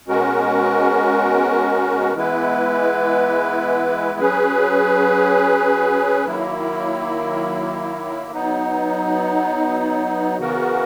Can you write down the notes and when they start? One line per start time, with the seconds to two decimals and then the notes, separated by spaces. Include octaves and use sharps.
0.08 B2 G#3 C#4 F#4 A#4
2.13 E3 G#3 B3 E4 B4
4.20 F#3 C#4 G#4 B4
6.25 D#3 F#3 A#3 E4
8.31 F#3 B3 D#4
10.37 C#3 E3 B3 F#4 A#4